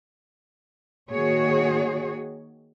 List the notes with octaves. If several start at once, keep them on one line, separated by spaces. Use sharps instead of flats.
D#3 A#3 F#4 G#4 C#5